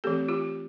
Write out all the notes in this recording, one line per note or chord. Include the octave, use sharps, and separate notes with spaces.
E3 A3 C4 G4 A4
F4 G4